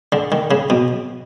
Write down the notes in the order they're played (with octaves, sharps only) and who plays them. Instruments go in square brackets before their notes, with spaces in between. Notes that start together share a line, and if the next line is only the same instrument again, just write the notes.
[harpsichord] D3
D#3
C#3
B2